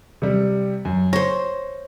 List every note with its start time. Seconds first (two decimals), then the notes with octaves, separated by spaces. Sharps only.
0.22 C3 G3
0.85 F#2
1.13 C5 C#5 A#6